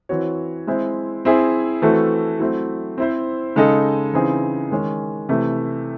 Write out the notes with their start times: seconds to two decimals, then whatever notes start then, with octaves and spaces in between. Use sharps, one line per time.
0.09 E3 C4 F#4 C#5
0.67 G#3 C4 E4 C5
1.25 C4 E4 G#4
1.82 E3 A3 C4 F#4 A4
2.40 F#3 A3 C4 E4
2.98 C4 E4 C5
3.56 C#3 G#3 D#4 A4 D#5
4.13 C#3 E3 C4 D#4 G#4
4.71 D#3 G#3 C#4
5.29 C3 E3 A3